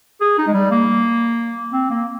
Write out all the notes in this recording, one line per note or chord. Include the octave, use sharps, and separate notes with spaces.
G#4
D#4
G#3
G3
A#3
C4
A#3